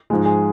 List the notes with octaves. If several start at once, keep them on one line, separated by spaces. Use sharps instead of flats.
G#2 F3 G#3
G#4